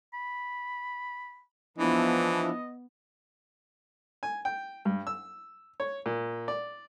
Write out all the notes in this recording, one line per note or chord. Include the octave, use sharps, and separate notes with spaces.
B5
E3 F3 B3 D4 E4 D#5
G#5
G5
G2
E6
C#5
A#2
D5